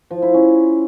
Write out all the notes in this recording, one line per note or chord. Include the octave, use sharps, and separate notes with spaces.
F3
E4
C#4